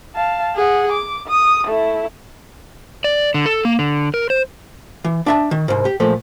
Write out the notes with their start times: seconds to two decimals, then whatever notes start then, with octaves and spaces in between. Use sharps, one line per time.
0.15 F5 A5
0.55 G#4 F#5
0.92 D6
1.28 D#6
1.67 A3 E4
3.04 D5
3.34 D3
3.46 A4
3.65 A#3
3.79 D3
4.14 A#4
4.30 C5
5.04 E3
5.26 D4 E5 A5
5.51 D#3
5.68 C2 G#2
5.85 G4
6.00 A#2 F3 A3